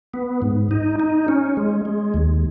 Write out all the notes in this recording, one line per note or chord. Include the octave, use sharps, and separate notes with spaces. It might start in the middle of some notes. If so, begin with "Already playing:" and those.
B3
G#2
D#4
D#4
C#4
G#3
G#3
D#2